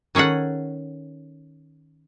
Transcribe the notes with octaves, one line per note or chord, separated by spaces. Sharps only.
D#3 C#4 G#4 A4 F#5